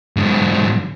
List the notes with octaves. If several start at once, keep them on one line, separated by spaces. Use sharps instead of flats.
G#2 D3